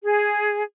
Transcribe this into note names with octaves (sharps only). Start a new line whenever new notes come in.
G#4